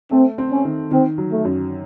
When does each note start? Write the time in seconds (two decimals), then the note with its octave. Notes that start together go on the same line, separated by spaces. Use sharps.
0.11 A3 C4
0.38 C4
0.51 C#4
0.65 D#3
0.91 D#3 C4
1.18 F#3
1.32 A3
1.45 F#2